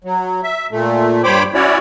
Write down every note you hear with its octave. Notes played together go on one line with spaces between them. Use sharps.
F#3
E5
A#2 A3
G2 C5 C#5 G5 B5 D6
C#4 E4 F#4 C#5 D5